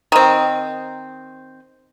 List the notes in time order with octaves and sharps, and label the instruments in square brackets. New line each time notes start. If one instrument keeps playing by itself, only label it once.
[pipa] D#3 C4